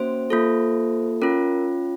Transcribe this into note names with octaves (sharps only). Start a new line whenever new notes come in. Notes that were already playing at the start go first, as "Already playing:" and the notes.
Already playing: A#3 C#4 F#4 C5
A#3 F4 A4
C#4 F4 A#4